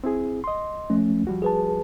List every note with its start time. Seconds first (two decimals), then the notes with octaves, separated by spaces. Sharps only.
0.04 C4 E4 G#4
0.44 D#5 C6
0.90 F3 A3 C#4
1.27 F3 G3 F#4
1.42 G#4 B4 A5